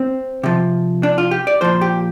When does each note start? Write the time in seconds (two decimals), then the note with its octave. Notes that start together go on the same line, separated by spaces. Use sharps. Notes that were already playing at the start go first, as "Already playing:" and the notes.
Already playing: C4
0.43 C3 F3
1.03 D4
1.18 F4
1.31 G4
1.47 D5
1.61 A#2 F3 C5
1.81 G4